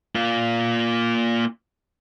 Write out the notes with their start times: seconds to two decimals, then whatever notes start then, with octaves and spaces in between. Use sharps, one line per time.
0.15 A#3 F4